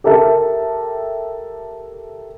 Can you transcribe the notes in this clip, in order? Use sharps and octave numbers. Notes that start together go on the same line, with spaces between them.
G4 A4 A#4 E5 A5